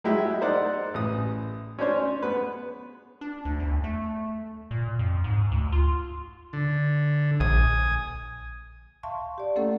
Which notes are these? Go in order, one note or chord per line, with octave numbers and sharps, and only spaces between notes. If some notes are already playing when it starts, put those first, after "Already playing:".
F#3 G#3 E4 G4
D#4 A#4 C5 D5 F#5
A1 D#6
C#4 D4 C5 C#5
B3 B4
D4
D2
E2
A3
A#2
F2
G#2
D2
F4
D3
A#1 G#5 D#6
E5 F5 A5 C6 C#6
G4 D5
A3 A#3 C#4 E4 A4 F#5